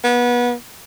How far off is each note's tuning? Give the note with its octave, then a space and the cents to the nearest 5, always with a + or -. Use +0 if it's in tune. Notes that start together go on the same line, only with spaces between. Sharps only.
B3 -25